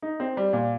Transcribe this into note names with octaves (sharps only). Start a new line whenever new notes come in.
D#4
C4
G3
A#2